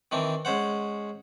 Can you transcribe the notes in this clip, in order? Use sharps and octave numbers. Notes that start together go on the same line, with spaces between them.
D#3 E3 C4 D4
G#3 C#4 C5 F#5